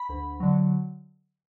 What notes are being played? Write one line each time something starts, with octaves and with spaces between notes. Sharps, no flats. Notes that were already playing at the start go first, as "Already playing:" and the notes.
Already playing: B5
D2
D3 F#3